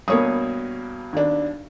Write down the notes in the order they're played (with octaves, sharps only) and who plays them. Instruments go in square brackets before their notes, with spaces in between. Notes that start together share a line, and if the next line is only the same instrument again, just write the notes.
[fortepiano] G2 B2 [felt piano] A#3 C#5 D#6
[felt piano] D#2 D4